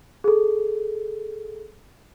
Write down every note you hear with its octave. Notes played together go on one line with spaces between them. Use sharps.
G#4 A4